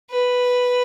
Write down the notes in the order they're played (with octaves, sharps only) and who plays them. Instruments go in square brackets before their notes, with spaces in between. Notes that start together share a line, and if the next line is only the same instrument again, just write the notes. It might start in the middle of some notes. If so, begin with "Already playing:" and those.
[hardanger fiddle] B4